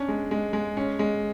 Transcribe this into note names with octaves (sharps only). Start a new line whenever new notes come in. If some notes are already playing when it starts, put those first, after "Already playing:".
Already playing: C#4 D4
G#3
G#3
G#3
C#4
G#3